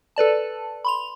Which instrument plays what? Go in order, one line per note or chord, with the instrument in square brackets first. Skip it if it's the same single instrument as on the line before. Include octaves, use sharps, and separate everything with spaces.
[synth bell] A4 B4 D5 A5
B5 C6 F7